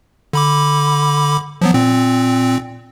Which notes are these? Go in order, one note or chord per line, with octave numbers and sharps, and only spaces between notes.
D3 B5 D6
F3 F#3 B3
A#2 C4